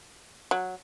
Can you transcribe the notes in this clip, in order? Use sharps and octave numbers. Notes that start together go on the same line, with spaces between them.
F#3